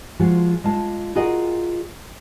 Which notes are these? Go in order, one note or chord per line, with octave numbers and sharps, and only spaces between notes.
F3 G#3 F4 F#4
G#3 F4 A5
F4 F#4 G#4 A#4 D#5